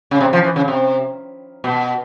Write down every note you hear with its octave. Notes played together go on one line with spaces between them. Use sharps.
C#3
C3
F3
E3
C#3
C3
B2